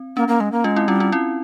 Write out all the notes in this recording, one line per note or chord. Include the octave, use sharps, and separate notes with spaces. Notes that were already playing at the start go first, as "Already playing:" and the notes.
Already playing: C4
A#3 C#4
A#3
G#3
A#3
G#3 C#4 F4
C4 E4
G3 C#4 F4
C#4 F4
C4 E4